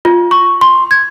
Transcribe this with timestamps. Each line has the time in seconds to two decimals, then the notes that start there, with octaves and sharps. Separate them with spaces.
0.05 F4
0.31 C#6
0.61 C6
0.91 G#6